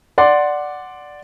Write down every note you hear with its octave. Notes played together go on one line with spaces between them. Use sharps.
D5 F#5 C6 D6